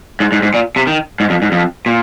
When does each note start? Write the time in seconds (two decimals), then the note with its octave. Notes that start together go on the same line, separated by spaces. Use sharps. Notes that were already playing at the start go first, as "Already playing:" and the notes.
0.20 G#2
0.32 G#2
0.43 G#2
0.54 A#2
0.76 C3
0.87 D#3
1.20 G#2
1.30 F2
1.42 G#2
1.52 F2
1.86 A#2